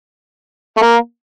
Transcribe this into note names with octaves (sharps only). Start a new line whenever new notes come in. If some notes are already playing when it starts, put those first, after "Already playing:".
A3
A#3